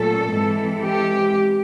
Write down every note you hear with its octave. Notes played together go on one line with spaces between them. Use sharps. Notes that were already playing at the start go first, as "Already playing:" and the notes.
Already playing: A#2 F#3 A3 C#4 A4
G#2 E3 G#3 C4
G4